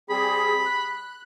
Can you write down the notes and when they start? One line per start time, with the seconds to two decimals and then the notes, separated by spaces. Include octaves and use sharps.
0.10 G3 C4 G#4 B5
0.65 F#6